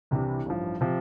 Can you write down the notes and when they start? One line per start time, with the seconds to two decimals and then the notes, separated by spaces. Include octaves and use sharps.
0.11 C2 C3 E3 G3 D4
0.46 A1 G2 F3
0.81 C3 F3